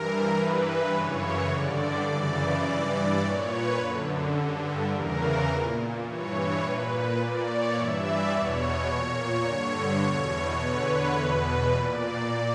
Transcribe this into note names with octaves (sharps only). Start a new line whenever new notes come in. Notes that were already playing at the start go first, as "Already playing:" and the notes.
Already playing: G2 E3 A#4
G2 E3 B4
F#2 C#3 E3 C#5
G2 D3 D5
F#2 C#3 E3
G2 E3
A#2 C#5
B4
F#2 D3
G2 D3
E2 C#3 E3 A#4
A#2
G2 E3 C#5
A#2 B4
B4
A#2 D5
C#5
G2 E3 E5
D5
E2 B2 C#5
A#2
G2 D3
E2 B2
E2 D3 B4
C#5
E2 B2 B4
A#2 D5